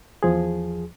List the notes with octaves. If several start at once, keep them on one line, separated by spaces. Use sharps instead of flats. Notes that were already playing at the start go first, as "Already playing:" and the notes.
E2 F3 G#4